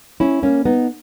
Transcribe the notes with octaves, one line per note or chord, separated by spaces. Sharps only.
C#4 E4
A#3 C#4
B3 D#4